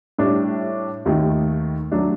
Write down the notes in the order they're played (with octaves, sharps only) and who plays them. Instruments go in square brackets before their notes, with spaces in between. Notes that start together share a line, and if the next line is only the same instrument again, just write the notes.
[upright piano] A2 G3 D4
D#2 D#3 A3 D#4
F#3 A3 D4